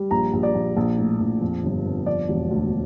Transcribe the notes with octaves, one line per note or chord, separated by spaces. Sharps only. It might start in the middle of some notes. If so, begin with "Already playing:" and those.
Already playing: G3
A#1 A#5
A#1
D5
A#1
A#1
A2
A#1
F2
G1
F2
F3 D5
E1
D2